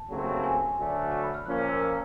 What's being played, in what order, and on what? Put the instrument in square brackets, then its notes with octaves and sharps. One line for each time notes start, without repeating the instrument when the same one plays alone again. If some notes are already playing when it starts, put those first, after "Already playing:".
Already playing: [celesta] A5
[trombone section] D#2 C#3 F#3 A3 C4
[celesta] G#5
[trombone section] D2 D3 F#3 A3 D4
[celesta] A5
B5
F6
[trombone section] A#2 F3 A#3 C#4 [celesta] F#6
[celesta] F6
E6
E6
A#5